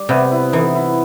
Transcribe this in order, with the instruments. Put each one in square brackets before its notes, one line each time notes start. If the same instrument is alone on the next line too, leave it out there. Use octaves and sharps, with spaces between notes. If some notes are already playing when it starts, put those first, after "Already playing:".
Already playing: [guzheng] G3
[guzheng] C3 [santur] B3
[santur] E4
[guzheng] E3 [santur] D#4
[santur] E4